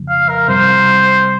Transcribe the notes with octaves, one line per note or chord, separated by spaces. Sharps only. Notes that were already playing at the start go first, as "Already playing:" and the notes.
Already playing: F2 C#3 F3 A#3
F5
A#4
C3 G3 C4 C5